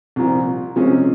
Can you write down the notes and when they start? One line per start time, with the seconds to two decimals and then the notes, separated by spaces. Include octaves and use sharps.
0.16 C2 A#2 F3
0.76 C3 F3 G#3 C#4